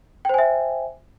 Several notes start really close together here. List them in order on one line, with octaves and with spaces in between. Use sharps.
G5 C5 G#5 E5